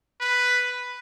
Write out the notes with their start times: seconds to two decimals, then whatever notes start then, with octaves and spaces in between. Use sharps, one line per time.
0.21 B4